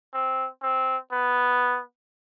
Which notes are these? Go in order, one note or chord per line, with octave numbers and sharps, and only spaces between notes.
C4
C4
B3